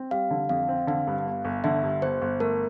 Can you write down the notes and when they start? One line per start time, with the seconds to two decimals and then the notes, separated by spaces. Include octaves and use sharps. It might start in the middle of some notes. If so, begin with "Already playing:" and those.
Already playing: C4
0.11 G3 F5
0.31 D3
0.49 F2 F5
0.69 C4
0.87 D3 F5
1.07 G2
1.26 G1
1.45 G1
1.64 D3 E5
1.83 G2
2.02 G1 C5
2.22 G1
2.40 A3 A#4